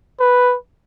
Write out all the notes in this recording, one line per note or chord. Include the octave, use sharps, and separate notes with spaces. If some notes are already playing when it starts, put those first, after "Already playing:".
B4